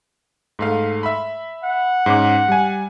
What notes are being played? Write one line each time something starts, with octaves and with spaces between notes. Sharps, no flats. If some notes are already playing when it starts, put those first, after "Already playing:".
G#2 A3 F5
E5 B5
F#5
G#2 C#4 D6
G3 G#5